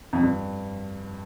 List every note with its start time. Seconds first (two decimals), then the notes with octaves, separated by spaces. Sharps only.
0.13 F2
0.23 G2